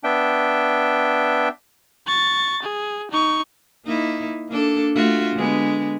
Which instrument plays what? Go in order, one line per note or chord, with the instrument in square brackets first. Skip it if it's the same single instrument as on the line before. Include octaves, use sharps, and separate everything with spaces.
[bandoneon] B3 D4 E5 G5
[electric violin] C#6 A6
G#4
D#4 C#6
[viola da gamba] A#3 D#4 E4
A#3 D4 A4
A3 F4 F#4
D3 G#3 B3